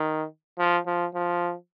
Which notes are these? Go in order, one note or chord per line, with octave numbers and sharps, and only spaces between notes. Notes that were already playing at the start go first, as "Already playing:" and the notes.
Already playing: D#3
F3
F3
F3